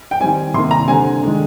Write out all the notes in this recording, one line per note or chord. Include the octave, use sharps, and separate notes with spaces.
G5
D#3 G3 C4 G#5
C3 D#3 A#3 C6
A#5
D3 G3 C4 G#5
D#3 G#3 D4